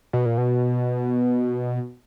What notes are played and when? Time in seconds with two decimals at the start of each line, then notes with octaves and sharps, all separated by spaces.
0.13 B2
0.26 A#2
0.38 B2